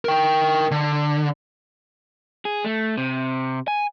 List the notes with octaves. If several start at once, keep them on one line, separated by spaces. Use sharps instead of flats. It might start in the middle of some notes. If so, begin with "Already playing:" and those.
A#4 G5
D3
G#4
A3
C3
G#5